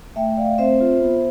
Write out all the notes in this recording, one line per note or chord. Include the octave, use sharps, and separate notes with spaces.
A3 E5 G5
A3 D5 F5
C4 C5 E5
F4
B3